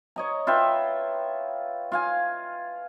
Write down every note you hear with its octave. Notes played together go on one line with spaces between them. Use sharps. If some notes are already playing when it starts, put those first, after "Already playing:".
C#5 D#5 A#5
F4 B4 E5 G5
F4 F5 G#5